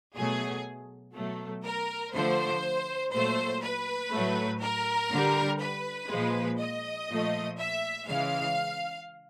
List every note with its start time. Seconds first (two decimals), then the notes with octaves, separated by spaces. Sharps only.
0.15 B2 F#3 A3 G#4
1.15 B2 F#3 A3
1.63 A#4
2.14 D3 F3 A3 C5
3.11 A#2 F#3 A3 C5
3.61 B4
4.10 A2 F#3 A3
4.61 A#4
5.09 D3
5.15 G3
5.59 B4
6.09 A#2 F3 G#3
6.59 D#5
7.08 A#2 F3 A3
7.58 E5
8.06 C#3 E3 G#3 F5